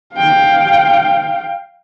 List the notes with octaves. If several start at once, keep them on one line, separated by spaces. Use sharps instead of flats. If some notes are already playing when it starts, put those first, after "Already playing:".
F5 G5